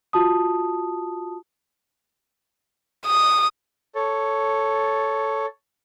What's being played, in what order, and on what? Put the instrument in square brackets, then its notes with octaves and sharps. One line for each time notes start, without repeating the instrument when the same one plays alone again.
[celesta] F4 F#4 A5 D#6
[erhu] D#6
[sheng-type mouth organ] A4 C#5